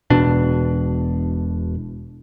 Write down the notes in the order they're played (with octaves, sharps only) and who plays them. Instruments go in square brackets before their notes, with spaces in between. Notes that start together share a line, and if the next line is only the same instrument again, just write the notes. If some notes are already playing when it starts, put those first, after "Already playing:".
[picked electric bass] E1 B2 D4